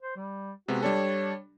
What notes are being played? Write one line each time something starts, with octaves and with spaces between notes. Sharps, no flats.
C5
G3
C3 G#3 B3 F#4
G3 D4 A4 C#5